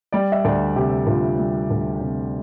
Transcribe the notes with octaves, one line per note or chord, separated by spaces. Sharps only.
G3 D5
E5
D2 D5
C3 G4
D2 F4
G3
D2
C3